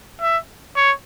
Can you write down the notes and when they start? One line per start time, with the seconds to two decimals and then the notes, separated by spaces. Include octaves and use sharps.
0.21 E5
0.76 C#5